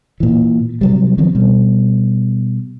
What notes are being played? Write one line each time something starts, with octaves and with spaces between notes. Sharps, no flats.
A#2 E3
C3 F#3 G3
D#3 F3 C4
B2 G3